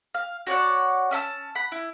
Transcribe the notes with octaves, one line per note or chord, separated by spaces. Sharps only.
F5
F#4 C#5 D5 F#5
C#4 E5 A5 E6
F#5 B5
E4